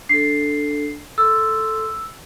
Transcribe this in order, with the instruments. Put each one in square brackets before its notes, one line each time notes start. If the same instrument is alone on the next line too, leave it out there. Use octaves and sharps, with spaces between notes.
[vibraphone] D4 A4 [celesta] C7
[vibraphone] A4 C6 [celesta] E6